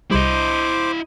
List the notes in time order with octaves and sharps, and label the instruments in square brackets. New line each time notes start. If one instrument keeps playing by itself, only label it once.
[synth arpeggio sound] C2 G3 [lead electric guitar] E4 D#5 [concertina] C5 D6